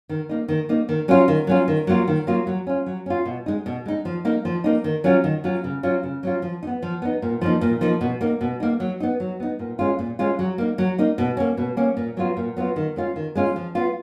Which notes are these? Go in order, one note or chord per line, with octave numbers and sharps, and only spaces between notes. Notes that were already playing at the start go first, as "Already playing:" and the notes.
D#3
A#3 D#4
D#3
A#3 D#4
D#3
F#3 C#4 F4
D#3
F#3 C#4 F4
D#3
F#3 A#3 F4
D#3
F#3 A#3 F4
F#3
C#4 F4
F#3
C#4 F4
B2
G#3 D#4
B2
G#3 D#4
F3
A#3 D#4
F3
A#3 D#4
D#3
F#3 C#4 F4
D#3
F#3 C#4 F4
C#3
F#3 C#4 F4
C#3
F#3 C#4 F4
F3
D#4
B3
F3
B3 D#4
A#2
F3 A#3 D#4
A#2
F3 A#3 D#4
B2
A#3 D#4
B2
A#3 D#4
F#3
B3 D#4
F#3
B3 D#4
A#2
G#3 C#4 F4
A#2
G#3 C#4 F4
F#3
A#3 D#4
F#3
A#3 D#4
B2
A#3 C#4
B2
A#3 C#4
A#2
F#3 B3 F4
A#2
F#3 B3 F4
D#3
G#3 C#4 F4
D#3
G#3 C#4 F4
F3
B3 F4